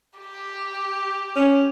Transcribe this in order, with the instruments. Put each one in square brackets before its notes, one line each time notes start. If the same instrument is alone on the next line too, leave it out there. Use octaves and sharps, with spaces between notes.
[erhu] G4
[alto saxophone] C#4